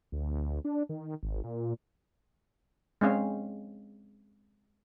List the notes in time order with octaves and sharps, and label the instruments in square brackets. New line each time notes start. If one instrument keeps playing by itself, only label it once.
[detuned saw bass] D2
D4
D#3
G#1
A#2
[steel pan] G#3 C4 C#4 F5